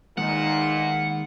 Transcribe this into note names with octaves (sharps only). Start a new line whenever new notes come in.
E2 A#2 D#3 G#3 A#3 D#4 F#5